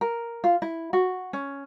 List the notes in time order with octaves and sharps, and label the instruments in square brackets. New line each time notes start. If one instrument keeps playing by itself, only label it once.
[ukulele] A#4
F4
E4
F#4
C#4